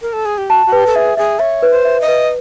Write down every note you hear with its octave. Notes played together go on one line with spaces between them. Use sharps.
A#4
A4
G#4
G4
F#4 A5
F#4
G4 B4
A4
G#4 E5
G#4 E5
C#5 E5
B4
C5
E5
D#5
B4